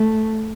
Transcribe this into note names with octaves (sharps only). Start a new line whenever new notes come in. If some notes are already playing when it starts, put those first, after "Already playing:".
Already playing: A3